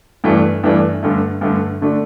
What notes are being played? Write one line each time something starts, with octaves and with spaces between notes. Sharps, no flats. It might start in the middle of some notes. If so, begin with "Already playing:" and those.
G2 E3 A3 D4
G2 E3 A3 D4
G2 D3 A3
G2 D3 A3
D3 A3 D4